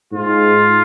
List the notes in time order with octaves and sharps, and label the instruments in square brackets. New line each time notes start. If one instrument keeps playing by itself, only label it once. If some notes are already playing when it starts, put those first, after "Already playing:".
[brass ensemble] G#2 G#3 F4